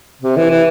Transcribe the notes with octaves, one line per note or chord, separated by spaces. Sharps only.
C3
E3
E3